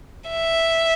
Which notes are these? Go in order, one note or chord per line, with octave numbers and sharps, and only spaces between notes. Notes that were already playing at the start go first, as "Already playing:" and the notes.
E5